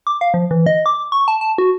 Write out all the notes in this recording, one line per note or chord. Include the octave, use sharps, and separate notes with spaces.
D6
F5
F3
E3
D#5
D6
C#6
A5
A5
F#4